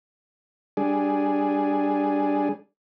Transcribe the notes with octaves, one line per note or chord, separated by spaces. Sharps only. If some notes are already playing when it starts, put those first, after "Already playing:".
G3 D4 G#4